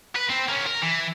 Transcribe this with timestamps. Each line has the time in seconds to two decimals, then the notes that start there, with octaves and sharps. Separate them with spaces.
0.16 B4
0.30 C4
0.49 A#3 C#4
0.67 A#4
0.82 E3